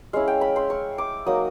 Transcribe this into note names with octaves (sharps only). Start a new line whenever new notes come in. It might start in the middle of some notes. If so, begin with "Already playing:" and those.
G#3 C#4 E4 F5
G5
B5
C6
C#6
D6
F#3 A#3 D#4 D#6